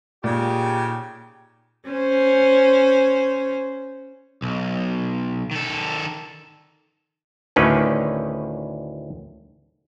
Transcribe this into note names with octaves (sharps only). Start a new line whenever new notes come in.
A#2 C#3 D#4 G4
C#4 C5
B1
D#3 A4
D2 A2 D3 D#3 C#4 B4